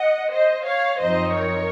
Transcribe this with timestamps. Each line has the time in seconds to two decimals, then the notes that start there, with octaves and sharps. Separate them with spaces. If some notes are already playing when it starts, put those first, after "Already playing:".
Already playing: D#5 F#5
0.32 C5 D#5
0.66 C#5 F5
1.00 F#2 F3 C4 D#4 C5 D#5
1.34 A#4 C#5